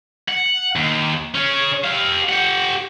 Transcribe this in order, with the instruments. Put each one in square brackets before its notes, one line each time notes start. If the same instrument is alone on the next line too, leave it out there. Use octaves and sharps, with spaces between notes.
[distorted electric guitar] F#5
D#2
C#4 G#4
G4 F5
G4 F#5